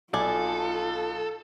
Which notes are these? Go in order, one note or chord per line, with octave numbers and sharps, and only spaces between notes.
B1 F4 A4 D5 G#5